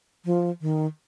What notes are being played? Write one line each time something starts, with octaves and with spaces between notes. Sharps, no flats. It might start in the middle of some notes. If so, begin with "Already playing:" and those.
F3
D#3